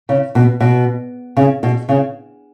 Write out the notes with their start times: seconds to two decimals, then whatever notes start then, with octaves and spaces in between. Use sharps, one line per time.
0.09 C#3
0.35 B2
0.60 B2
1.37 C#3
1.63 B2
1.89 C#3